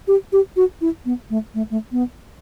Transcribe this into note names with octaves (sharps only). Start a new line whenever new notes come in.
G4
G4
F#4
E4
B3
A3
A3
A3
B3